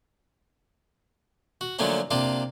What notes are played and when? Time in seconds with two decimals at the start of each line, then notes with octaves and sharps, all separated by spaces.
1.61 F#4
1.79 D3 F3 F#3 A3 A#3 C#4
2.11 C3 A#3 D4 F4